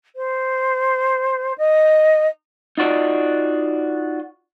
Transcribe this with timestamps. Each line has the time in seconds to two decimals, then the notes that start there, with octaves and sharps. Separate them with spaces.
0.15 C5
1.57 D#5
2.78 D#4 F4 F#4 D5 D#5